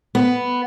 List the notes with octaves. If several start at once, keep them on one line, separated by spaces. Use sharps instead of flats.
B3